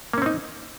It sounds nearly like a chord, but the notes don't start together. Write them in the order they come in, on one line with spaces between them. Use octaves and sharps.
A#3 C#4 C4 D#4